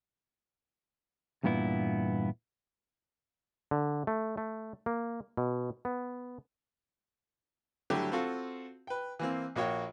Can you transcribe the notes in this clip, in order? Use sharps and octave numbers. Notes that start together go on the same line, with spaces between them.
E2 G2 A#2 B3 E4
D3
A3
A3
A#3
B2
B3
D3 F#3 G3 A3 E4 G4
C4 F4 F#4 A4
B4 G5
E3 A#3 C4
A#1 A#3 F#4 C#5 G5